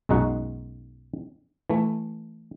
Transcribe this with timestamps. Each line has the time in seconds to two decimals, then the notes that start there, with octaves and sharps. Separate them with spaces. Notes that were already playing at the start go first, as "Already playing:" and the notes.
0.09 B1 F#2 G#3 D#4 F#4 F#5
1.70 E3 A3